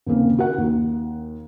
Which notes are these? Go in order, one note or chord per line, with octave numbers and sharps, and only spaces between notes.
D#2 C#3 A#3 C4
F#4 A#4 F#5
D#2